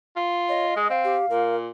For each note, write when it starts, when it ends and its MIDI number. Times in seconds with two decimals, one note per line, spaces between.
0.16 0.71 65
0.49 0.66 73
0.49 0.92 75
0.76 0.85 56
0.76 0.90 87
0.90 1.16 60
0.90 1.55 77
1.04 1.26 67
1.30 1.69 46
1.30 1.57 70